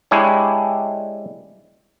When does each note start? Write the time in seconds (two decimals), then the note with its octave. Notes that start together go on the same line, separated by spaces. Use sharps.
0.11 G#3 D4 E4 G4 C#5